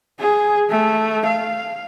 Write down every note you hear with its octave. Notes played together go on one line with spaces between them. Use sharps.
G#4
A3
F5